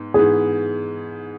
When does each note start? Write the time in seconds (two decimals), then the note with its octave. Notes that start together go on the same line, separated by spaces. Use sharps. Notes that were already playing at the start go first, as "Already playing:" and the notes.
Already playing: G#2 B3
0.14 G#2 E3 B3 G#4